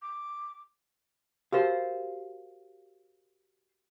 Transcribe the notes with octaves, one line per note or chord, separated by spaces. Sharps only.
D6
F#4 G4 A#4 C5 F5